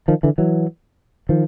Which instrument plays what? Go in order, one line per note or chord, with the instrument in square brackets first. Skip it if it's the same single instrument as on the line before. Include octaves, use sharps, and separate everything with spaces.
[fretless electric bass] D#3 F3
D3 E3
E3 F#3
D#3 F3